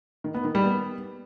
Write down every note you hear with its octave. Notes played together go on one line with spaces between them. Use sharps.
D#3
B3
D#3
G3
B3